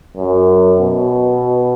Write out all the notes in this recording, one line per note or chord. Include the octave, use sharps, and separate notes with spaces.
F#2
B2